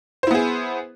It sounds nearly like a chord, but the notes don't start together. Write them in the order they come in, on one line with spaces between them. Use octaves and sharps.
C5 E4 B3 G#4